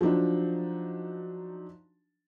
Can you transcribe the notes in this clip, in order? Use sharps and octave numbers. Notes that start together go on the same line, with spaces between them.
F3 F#3 D4 D#4